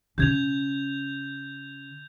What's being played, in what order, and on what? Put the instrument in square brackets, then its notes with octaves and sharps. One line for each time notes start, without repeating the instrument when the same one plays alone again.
[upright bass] C#3 C#4 [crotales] G6 G#6 F7